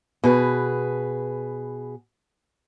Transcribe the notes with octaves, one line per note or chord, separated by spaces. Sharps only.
B2 G#4 B4